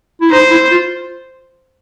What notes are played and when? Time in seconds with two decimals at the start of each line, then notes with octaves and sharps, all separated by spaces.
0.21 E4
0.31 D#4 C5
0.51 E4
0.71 F4